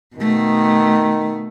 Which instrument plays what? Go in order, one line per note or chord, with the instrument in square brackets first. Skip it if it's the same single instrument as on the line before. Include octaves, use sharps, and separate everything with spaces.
[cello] B2 A3 [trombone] D#3